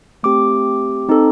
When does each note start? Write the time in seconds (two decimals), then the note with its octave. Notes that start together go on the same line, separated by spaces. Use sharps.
0.23 A3 C4 G4 D6
1.09 C4 D#4 A4